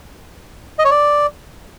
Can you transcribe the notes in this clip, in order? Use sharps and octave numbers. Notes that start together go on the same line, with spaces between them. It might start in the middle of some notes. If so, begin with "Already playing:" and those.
D#5
C#5
D5